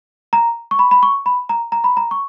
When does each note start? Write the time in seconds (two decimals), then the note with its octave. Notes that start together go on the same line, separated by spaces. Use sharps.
0.33 A#5
0.71 C#6
0.79 B5
0.91 B5
1.03 C#6
1.26 B5
1.49 A#5
1.72 A#5
1.84 B5
1.97 A#5
2.11 C#6